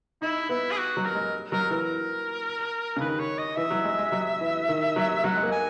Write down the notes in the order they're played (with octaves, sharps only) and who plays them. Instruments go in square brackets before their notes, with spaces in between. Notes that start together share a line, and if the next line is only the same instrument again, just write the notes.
[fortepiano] D#4 [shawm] E4
[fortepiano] B3 [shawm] E4
[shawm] G#4
F#4
[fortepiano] F#3
[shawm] A#4
[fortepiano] G#3
[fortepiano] F#3 [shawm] A#4
[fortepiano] E3 [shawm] A#4
[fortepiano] C#3
[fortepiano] D#3 [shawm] B4
[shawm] C#5
D#5
[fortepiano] E3 [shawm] E5
[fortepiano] F#3
G#3
G#3
F#3
E3
D#3
F#3
[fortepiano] F#3 [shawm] F#5
[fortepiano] G#3
A#3
[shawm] G#5